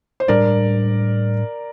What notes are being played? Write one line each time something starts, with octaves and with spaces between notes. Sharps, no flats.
C5
A2 G3 D4 A#4 D5